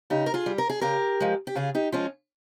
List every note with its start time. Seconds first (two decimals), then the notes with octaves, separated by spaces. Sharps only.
0.10 C#3 D#4 G4
0.26 A#4
0.34 F4 G#4
0.46 G3
0.58 A#4
0.70 G#4
0.81 C#3 G4 A#4
1.20 F3 G#3
1.47 G4
1.55 C#3 F4 G#4
1.75 D#4 G4
1.92 F3 G#3 C#4 F4